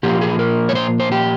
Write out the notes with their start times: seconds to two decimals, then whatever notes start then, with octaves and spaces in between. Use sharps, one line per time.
0.03 A#2 F3 A#3 G4
0.21 G#4
0.39 A#4
0.69 C#5
0.75 C5
1.00 C5
1.12 G4